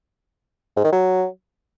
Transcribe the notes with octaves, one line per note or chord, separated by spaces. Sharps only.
G#2
D#3
F#3